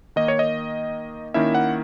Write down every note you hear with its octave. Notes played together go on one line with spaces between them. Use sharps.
D#3 A#3 D#4 D#5
C#5
D#5
D#3 A#3 C#4 E4 E5
F#5